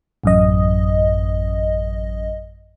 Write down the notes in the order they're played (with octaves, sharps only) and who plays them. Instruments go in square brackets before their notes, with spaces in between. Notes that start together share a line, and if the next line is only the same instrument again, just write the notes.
[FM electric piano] A1 F#2 D#5